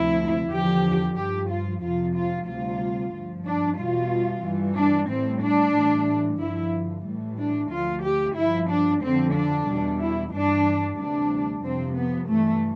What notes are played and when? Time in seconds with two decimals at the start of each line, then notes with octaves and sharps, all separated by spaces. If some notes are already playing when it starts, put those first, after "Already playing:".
Already playing: D2 C3 F3 E4
0.51 E2 D3 F3 G4
1.16 G2 F3 G4
1.49 F4
1.82 F2 C3 F3 F4
2.15 F4
2.47 D2 C3 G3 F4
3.13 G2 F3
3.46 D4
3.78 E2 B2 G3 F4
4.44 G2 E3 G3
4.76 D4
5.09 A2 G3 C4
5.42 D4
5.75 A2 E3 G3
6.40 G2 D3 F3 E4
7.05 A2 E3 G3
7.38 D4
7.71 D2 D3 F3 F4
8.03 G4
8.36 G2 F3 E4
8.70 D4
9.02 F2 D3 F3 C4
9.34 D4
9.67 E2 B2 G3
10.00 E4
10.33 G2 E3 G3 D4
10.98 D2 C3 E3 G3 D4
11.63 F2 C3 F3 C4
11.97 B3
12.29 G2 E3 G3 A3